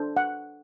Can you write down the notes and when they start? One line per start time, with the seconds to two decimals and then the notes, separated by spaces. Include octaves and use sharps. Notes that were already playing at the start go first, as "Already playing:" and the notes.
Already playing: D4 A4 C5
0.17 F#5